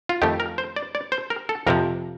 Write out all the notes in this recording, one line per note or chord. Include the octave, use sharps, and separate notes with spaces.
F4
F2 D#3 A3 G4
A#4
C5
D5
D5
C5
A#4
A4
F2 C3 F3 A#4